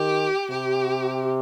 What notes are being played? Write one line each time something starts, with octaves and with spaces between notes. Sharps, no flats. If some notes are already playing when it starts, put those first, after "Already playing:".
Already playing: D#3 G4
C3 G4